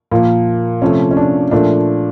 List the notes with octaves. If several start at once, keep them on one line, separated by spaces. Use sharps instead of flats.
A#2 F3 A#3
C3 F3 A3 C#4
C#4
D4
A#2 F3 A3 D4